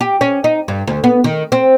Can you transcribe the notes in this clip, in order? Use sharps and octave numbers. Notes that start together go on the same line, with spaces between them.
G4
C#4
D#4
G2
D2
B3
D#3
C4